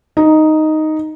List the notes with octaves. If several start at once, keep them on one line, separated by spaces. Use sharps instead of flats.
D#4